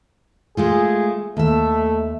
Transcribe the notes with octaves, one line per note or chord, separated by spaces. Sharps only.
G#3 A3 F4 G#4
D#2 A3 E5